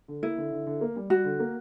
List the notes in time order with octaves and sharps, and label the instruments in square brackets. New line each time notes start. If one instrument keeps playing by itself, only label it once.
[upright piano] D3
[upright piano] A#3 [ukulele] E4
[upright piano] D3
D3
D3
A#3
G3
[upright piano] G3 [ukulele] F#4
[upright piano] D3
A#3